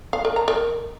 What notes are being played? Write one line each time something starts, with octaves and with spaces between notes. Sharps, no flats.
F5
A#4
A#5
A#4